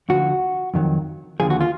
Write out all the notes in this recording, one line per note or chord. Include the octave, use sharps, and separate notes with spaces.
D2 D3 F3 F#4
F2 D#3 F#3
D#2 D3 F3 G#4
F#4
F4